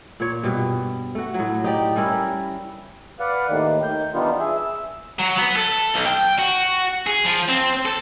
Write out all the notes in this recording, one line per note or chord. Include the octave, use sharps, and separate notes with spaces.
A#2 C#5
G2 B2
A3 F#4
A2 F#3
D#4 G4 D5
G3 C#4 E4 A#4
B4 D5 F5 F#5
D#2 A2 D#3
D#3 G6
E3 G3 B3 D4 D#4 F4
G#4 E5
E6
F#3
B3
A4
B1
G5
F#4
G#4
F3
C4
A4